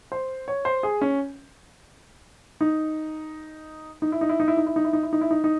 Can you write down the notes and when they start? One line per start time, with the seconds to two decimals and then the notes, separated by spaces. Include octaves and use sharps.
0.12 C5
0.48 C#5
0.65 C5
0.83 G#4
1.01 C#4
2.61 D#4
4.02 D#4
4.12 E4
4.21 D#4
4.29 E4
4.40 D#4
4.48 E4
4.57 D#4
4.66 E4
4.76 D#4
4.84 E4
4.93 D#4
5.03 E4
5.13 D#4
5.21 E4
5.31 D#4
5.44 D#4